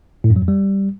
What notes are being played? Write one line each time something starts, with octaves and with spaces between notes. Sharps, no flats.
A2
F#2
F#3
F2
G3